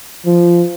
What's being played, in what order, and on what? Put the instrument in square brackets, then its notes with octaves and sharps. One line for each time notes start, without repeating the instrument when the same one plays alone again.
[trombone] F3